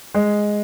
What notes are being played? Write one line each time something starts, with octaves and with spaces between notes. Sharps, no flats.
G#3